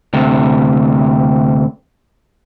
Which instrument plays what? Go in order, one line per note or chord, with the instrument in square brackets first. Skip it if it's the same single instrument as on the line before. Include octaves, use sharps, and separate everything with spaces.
[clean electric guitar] D2 C3